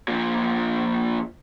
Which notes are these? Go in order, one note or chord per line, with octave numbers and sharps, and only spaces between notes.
A#2 F3